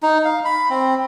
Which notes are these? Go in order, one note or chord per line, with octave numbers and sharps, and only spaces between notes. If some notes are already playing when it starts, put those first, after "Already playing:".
D#4
F5
B5
C4